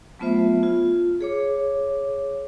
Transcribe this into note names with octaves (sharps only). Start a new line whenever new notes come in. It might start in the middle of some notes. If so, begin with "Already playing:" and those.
F#3 A3 B3 F4 C5 E5
F4
G#4 C#5 D6